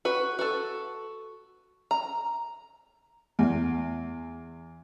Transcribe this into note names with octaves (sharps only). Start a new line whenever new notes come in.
F#4 B4
F#4 A4
A#5
E2